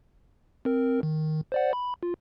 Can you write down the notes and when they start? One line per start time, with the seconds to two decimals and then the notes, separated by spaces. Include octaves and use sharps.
0.65 C4 A#4
1.03 D#3
1.52 C5 D5 F#5
1.73 B5
2.03 F4